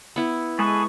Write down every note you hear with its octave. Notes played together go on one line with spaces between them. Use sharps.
B3 E4
G#3 G#4 A4 B4 C#6